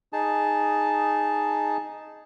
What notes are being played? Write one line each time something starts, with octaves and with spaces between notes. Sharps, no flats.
D#4 G#4 A5